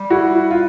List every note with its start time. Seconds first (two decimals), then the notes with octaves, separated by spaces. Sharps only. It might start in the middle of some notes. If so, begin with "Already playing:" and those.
Already playing: G3
0.10 E4 F#4
0.51 F4